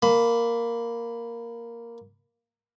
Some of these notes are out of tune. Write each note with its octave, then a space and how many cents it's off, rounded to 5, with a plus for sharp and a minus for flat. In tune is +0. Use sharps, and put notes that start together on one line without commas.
A#3 +0 B5 +10